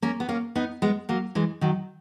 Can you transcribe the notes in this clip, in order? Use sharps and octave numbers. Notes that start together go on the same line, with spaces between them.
A#3 C#4
B3
A#3 C#4
B3 D#4
G#3 B3
F#3 A#3
E3 G#3
D#3 F#3